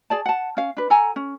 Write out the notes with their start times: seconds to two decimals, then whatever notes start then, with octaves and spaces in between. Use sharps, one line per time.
0.10 G#4 D5 A5
0.26 F#5 A5
0.57 C#4 F5
0.77 D4 B4
0.90 A4 F#5 G#5 A#5
1.16 C#4